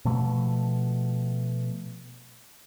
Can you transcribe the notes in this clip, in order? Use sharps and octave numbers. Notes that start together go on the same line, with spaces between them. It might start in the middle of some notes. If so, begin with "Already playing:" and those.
B2 F3 A3